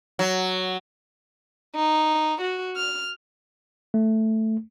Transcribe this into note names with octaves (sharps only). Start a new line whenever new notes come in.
F#3
D#4
F#4
F6
A3